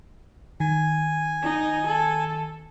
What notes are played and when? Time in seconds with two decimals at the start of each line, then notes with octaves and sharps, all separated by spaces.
0.60 D#3 G#5
1.42 D#4
1.86 A4